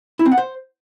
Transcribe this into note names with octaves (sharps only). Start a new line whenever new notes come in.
E4
C4
F#5
C5